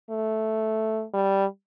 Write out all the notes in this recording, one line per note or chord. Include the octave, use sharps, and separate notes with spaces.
A3
G3